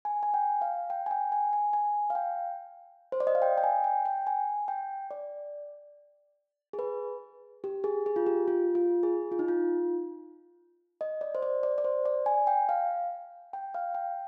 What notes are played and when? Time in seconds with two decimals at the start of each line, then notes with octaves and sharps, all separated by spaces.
0.05 G#5
0.23 G#5
0.34 G5
0.61 F5
0.90 G5
1.06 G#5
1.11 G5
1.32 G#5
1.53 G#5
1.73 G#5
2.10 F5
2.15 G5
3.12 C5
3.20 D5
3.27 D#5
3.35 F5
3.42 G5
3.58 G5
3.64 G#5
3.84 G5
4.06 G5
4.27 G#5
4.68 G5
5.11 D5
6.73 G#4
6.79 B4
7.64 G4
7.84 G#4
8.06 G#4
8.16 F4
8.26 G4
8.48 F4
8.75 F4
9.03 G#4
9.32 F4
9.39 D#4
9.48 F4
11.01 D#5
11.21 D5
11.35 C5
11.42 D5
11.63 D5
11.78 D5
11.84 C5
12.05 D5
12.26 G#5
12.47 G5
12.69 F5
13.53 G5
13.74 F5
13.95 G5